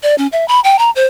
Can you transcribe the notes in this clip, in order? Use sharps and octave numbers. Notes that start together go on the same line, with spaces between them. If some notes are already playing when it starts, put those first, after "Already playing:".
D5
C#4
E5
B5
G5
A#5
C5